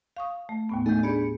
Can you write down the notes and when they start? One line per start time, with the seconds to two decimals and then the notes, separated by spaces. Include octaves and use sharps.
0.17 F5 C#6 D#6
0.49 A3
0.69 D#2 A2 B3
0.86 A3 D#4 G#5 G6
1.03 D4 G4 G#4 B5 C#7